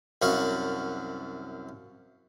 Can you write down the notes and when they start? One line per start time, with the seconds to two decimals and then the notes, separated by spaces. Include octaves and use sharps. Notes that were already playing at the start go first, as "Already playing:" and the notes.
0.22 C2 F#2 F#4 F5